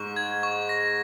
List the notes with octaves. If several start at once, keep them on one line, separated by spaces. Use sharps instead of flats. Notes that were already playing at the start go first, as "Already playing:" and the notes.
Already playing: G#2 C#6
G#6
C#6
A#6